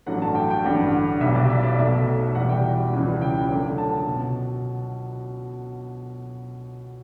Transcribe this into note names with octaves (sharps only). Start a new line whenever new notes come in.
A1 G2 F#3 A3 F#5
A5
G5
G5
A1 G2 D3 F#5
B1 B2 G3 E5
D5
E5
D5
B1 B2 A3 E5
E2 B2 G3 F#5
G5
C#2 C#3 E3 G3
G5
F#2 D3 A3
A5
B2